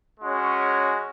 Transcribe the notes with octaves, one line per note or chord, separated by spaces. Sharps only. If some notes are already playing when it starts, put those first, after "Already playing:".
G#3 C#4 F#4